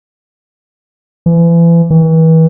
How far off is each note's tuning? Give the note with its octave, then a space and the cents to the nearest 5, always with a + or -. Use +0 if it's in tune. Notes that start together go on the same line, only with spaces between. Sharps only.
E3 +35
E3 -35